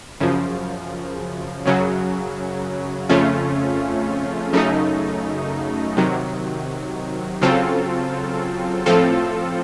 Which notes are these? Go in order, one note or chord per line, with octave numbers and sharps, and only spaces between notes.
F#2 C#3 F3
F#2 C#3 F#3
F2 C#3 A3 C#4 F4
F#2 C#3 A3 D#4
C3 D#3 F#3
C#3 F#3 C4 F4 A4
A2 F3 C4 F4 A4